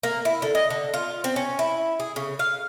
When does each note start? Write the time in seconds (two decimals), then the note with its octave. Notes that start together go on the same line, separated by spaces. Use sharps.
0.03 A#3
0.25 E4
0.42 D3
0.55 D#5
0.70 D3
0.94 F4
1.24 C4
1.36 C#4
1.59 E4
2.00 G#4
2.16 C#3
2.39 F5